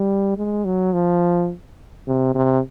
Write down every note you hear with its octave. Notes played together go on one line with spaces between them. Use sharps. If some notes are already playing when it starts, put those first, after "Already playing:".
Already playing: G3
G#3
F#3
F3
C3
C3